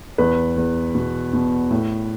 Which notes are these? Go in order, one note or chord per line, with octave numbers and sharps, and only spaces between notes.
E2 B4
E2
B2
B2
A2